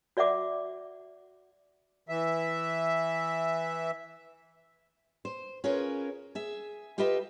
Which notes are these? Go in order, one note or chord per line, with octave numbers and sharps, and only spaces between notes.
F#4 D5 E5 F#5 D6
E3 E5
C5
C#4 F4 G#4 A#4 B4 C#5
G#4 E5
F4 G4 A4 B4 D#5 E5